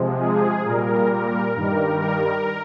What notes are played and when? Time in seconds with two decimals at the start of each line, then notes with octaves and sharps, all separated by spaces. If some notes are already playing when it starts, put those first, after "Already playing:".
Already playing: C3 F3 G#3
0.20 G#4
0.66 A#2 G3 A#4
1.11 A#4
1.55 G2 D#3 G3 A#4
2.00 A#4